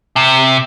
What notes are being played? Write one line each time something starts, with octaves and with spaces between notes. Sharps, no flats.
C3